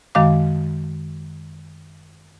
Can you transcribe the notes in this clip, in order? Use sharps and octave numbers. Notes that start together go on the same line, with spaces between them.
F#2 D#3 G#3 F5 D6